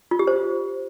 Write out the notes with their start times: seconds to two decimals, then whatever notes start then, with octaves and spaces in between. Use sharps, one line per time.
0.11 F4
0.19 G4
0.27 C5